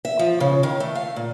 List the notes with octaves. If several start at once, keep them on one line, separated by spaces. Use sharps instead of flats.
E5
F3
C#3
D#3
A3
F5
A#2